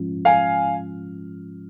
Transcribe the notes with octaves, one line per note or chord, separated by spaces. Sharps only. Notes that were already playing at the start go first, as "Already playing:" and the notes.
Already playing: G#2 F3 G#3 C#4 F4
F5 G#5